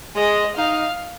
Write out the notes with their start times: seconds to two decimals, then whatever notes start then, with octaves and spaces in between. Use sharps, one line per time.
0.16 G#3 D#5
0.56 D#4 F5